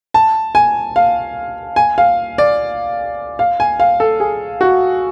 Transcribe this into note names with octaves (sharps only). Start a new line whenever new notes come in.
A5
G#5
F5
G#5
F5
D5
F5
G#5
F5
A4
G#4
F#4